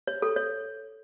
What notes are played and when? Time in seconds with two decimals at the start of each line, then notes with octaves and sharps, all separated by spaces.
0.07 C#5
0.22 A4
0.36 C#5